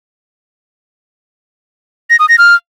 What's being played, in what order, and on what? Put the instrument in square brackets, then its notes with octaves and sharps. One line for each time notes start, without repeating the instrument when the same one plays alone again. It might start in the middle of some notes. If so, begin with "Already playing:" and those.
[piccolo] A#6
D#6
A#6
F6